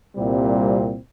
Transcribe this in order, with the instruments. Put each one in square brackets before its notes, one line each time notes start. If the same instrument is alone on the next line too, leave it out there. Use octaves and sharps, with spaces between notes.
[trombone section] C2 A#2 G3 C4